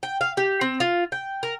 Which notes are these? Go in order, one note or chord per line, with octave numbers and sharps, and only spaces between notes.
G5
F5
G4
C4
F4
G5
A#4